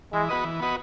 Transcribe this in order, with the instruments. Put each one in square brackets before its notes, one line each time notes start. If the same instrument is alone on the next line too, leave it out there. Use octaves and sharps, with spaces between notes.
[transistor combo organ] E3 [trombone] G#3
[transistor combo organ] B3 F#4 B4 D#5
E3
B3 F#4 B4 D#5